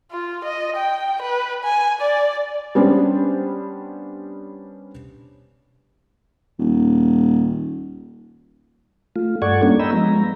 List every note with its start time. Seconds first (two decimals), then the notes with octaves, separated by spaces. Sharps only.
0.11 F4
0.44 D#5
0.76 G5
1.22 B4
1.64 G#5
2.01 D5
2.75 G3 B3 C#4 D4 G4 C5
6.59 D#1
9.16 A3 F4
9.42 G2 A4 D5 F#5 C#6 G#6
9.63 G3 A#3 C#4 D4
9.80 D#5 G5 A#5 B5 E6
9.92 F3 G#3 B3 A#5